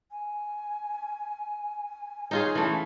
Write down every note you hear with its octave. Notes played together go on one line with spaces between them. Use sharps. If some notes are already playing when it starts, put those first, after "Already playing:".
G#5
D#4 F4 G#4 C#5
E3 A3 C#4